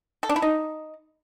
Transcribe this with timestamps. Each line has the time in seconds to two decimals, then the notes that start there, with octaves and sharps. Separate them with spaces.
0.23 A4
0.29 D4
0.36 E4
0.42 D#4